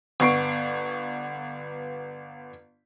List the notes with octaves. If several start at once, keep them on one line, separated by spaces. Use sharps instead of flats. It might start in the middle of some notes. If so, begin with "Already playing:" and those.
G1 B3 C#6 C7 D7